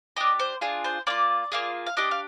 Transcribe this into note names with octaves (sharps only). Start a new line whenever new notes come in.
D4 G4 D#5
C5
D4 F4 G#4
C5
A#3 D4 F4 D5
A#3 F4 G#4
F5
D4 G4 D#5
F5